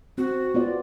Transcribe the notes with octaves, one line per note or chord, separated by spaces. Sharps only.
C4 F#4
B3 F4 D5